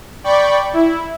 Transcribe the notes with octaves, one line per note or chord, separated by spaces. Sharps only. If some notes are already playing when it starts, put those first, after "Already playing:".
D5 G5 B5 C#6
E4